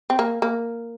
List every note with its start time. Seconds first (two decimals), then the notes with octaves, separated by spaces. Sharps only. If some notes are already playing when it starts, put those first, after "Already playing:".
0.10 C4
0.19 A#3
0.42 A#3